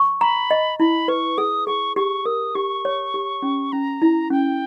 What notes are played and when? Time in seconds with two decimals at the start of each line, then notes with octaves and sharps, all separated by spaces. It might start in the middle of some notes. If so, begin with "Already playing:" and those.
Already playing: C#6
0.21 A#5 B5
0.51 D#5
0.79 E4 B5
1.08 B4 C#6
1.38 G#4 D#6
1.67 G#4 C#6
1.96 G4 C#6
2.25 A#4 D#6
2.55 G4 C#6
2.85 C#5
3.14 G4
3.42 C#4
3.72 C#4 A#5
4.02 E4
4.30 C#4 G5